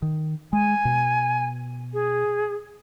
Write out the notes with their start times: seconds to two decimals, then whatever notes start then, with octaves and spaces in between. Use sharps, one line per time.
0.02 D#3
0.53 G#3 G#5
0.85 B2
1.93 G#4